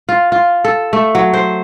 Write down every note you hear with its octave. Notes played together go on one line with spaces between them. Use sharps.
F4
F4
A4
A3
F#3
C5